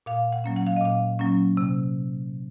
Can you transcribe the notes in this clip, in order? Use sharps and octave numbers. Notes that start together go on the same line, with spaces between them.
A#2 F5
F#5
F#3 A#3 C#4
F#5
F5
D#5
A#2 F5
F#3 A#3 C#4
C3